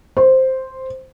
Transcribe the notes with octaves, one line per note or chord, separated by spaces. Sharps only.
C5